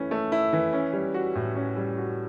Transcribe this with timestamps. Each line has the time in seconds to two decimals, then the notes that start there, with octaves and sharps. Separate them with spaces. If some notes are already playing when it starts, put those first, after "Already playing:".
Already playing: E3 A3 C#4 E4
0.11 A3
0.32 E4
0.53 E3
0.73 C#4
0.93 G3
1.14 F#4
1.35 A2
1.56 C#4
1.77 G3
1.98 F#4